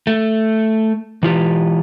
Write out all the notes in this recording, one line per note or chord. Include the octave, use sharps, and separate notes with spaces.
A3
E3 F4 G4